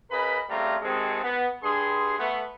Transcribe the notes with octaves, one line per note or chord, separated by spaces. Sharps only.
C#3 A#4 B4 D#5 B5
C#3 G3 A3 C4 F4 A#5
C3 D#3 G#3 C4 G#4 A4
B3
G2 G#4 C6
A3 B3